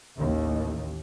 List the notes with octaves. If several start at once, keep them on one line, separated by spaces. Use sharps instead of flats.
A1 D#2